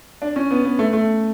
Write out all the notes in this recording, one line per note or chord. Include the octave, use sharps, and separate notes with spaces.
D4
C#4
B3
B3
A3
A3